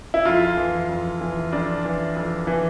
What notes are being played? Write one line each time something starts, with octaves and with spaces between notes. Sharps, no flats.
E4
F2 F4
E3
F2
E3
F2 D4
E3
F2
E3